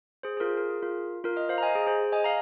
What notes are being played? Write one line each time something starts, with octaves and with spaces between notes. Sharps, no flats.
G#4 C5
G#4
F4 A#4
A#4
G#4
F4 A#4
F4 A#4
A#4 D#5
C5 F5
A#5
D#5 G#5
G#4
G#4 C5
D#5 G#5
F5 A#5